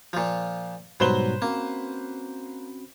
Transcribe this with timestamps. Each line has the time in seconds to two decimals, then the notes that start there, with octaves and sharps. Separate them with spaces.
0.13 A#2 F3
1.00 G#2 B2 F#3 G3 B4 C5 G7
1.42 A#3 C4 C#4 F#4